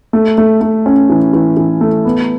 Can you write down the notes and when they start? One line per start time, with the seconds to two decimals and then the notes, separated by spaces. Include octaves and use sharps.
0.13 A3
0.38 A3
0.61 A3
0.86 C#4
1.09 E3
1.33 E3
1.57 E3
1.81 A3
2.05 B3